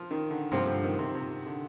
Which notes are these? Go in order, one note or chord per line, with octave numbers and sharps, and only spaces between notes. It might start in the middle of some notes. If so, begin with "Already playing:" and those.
Already playing: F3
D#3
D3
G2 C3 F3 A#3 F4
D3
D#3
C3
C3
D3